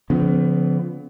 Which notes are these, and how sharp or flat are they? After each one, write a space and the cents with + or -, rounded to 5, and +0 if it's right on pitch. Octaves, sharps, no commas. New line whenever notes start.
D3 -45 F3 +0 B3 +30